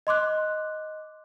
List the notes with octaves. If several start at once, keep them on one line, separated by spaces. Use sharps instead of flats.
D#5 C6 D6 F#6